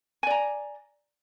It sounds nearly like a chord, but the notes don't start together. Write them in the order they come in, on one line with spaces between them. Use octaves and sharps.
G#5 D5 A#5